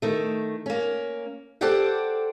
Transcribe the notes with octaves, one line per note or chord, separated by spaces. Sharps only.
D#3 A3
A#3 C#4
G4 A4 C5 D5 F#5 G5